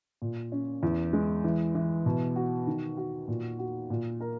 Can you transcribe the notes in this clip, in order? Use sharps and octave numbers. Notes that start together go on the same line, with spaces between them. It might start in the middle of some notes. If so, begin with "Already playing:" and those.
A#2
C#4
E2
G#3
E3
E3
B2
F#4
D#3
F#4
A#2
F#4
A#2
A#4